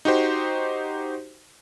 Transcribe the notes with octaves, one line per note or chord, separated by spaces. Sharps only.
D#4 F#4 G4 C5